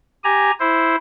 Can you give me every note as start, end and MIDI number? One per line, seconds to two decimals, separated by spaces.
0.24 0.51 67
0.24 0.51 80
0.24 0.51 82
0.60 0.96 64
0.60 0.96 72